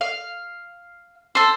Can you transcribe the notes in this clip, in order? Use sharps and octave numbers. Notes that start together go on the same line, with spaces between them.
F5
A4 C5